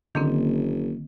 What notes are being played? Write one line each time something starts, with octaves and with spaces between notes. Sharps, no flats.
F#1 D3 D#3 A#3 C4